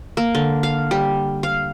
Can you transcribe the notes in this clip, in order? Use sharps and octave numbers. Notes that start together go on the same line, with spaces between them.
A#3
D3
F5
G3
F5